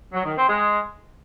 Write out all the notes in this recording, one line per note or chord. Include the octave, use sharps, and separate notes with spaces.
F#3
D#3
C4
G#3